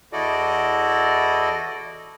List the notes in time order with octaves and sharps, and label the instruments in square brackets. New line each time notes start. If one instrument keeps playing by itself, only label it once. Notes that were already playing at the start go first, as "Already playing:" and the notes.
[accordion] E2 E4 F#4 A4 D5 D#5